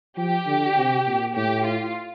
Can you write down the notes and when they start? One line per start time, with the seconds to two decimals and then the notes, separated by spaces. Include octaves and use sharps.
0.17 F3 G4
0.47 D3
0.77 C3
1.06 A#2
1.36 A2 G4
1.65 F4